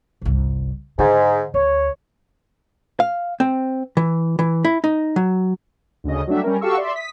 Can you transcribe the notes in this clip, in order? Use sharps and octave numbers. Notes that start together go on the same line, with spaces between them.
G1 C2
G#2 D3
D2 C#5
F5
C4
E3
E3
E4
D#4
F#3
D2 C#3 D#5
F#3 G3 A3 D4 E5
G3 C#4 A#4
F#4 G4 A4 F5 C#6 E6
D5 E5 C6
D#6 B6